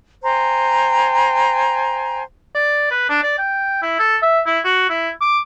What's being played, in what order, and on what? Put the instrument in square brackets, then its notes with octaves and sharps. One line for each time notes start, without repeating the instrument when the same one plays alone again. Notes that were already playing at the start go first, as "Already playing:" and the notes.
[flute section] C5 G5 G#5 A#5
[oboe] D5
B4
D4
D5
G5
E4
A4
E5
E4
F#4
E4
D6